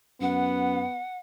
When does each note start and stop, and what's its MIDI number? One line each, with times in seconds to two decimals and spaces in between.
0.21 0.82 42
0.21 1.01 59
0.21 1.17 78